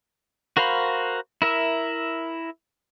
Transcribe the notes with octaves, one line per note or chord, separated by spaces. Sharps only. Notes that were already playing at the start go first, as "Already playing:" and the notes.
F#4 A#4 C5 F5 B5
E4 A#4 E5